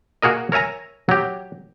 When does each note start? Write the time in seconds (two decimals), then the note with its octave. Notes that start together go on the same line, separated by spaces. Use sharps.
0.22 A#3 F#4 G#4 A#4 D#5
0.52 A#4 C#5 E5 G#5 A#5
1.09 F#3 G4